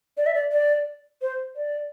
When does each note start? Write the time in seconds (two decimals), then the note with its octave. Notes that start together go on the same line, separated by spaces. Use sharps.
0.17 D5
0.26 E5
0.34 D5
0.52 D5
1.22 C5
1.56 D5